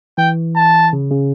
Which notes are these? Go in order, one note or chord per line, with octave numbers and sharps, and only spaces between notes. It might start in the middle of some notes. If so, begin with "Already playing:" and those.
E3 G5
A5
C#3
C#3